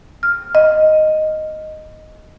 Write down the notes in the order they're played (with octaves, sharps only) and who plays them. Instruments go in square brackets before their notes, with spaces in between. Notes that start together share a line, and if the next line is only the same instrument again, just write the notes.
[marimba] F6
D#5